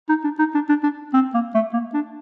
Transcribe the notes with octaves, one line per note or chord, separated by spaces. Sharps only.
D#4
D4
D#4
D4
D4
D4
C4
A#3
A3
A#3
D4